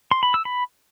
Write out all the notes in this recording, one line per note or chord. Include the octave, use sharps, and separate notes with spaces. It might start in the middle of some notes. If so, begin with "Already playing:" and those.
C6
B5
E6
B5